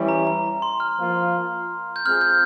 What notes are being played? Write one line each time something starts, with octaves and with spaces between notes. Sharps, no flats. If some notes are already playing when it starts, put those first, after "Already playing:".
Already playing: E3 G3 C#4 E4
A#5
A#5
C6
F6
F3 A#3 F4
G6
G#3 C4 F4 G#4 F6
G6